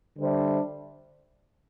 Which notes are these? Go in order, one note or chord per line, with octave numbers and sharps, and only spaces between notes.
D3 G3 D4 C5 E5